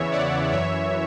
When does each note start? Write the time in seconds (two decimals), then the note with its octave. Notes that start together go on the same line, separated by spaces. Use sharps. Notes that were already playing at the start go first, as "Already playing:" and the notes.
Already playing: E2 C#3 E3 C#5 E5
0.12 D5 F#5
0.52 F#2 E3 C#5 E5